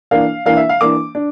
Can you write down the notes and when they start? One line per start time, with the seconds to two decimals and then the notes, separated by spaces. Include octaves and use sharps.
0.11 E3 A#3 D4 F5
0.46 E3 A#3 D4 F5
0.57 E5
0.69 F5
0.81 E3 A#3 D4 D6
1.15 D4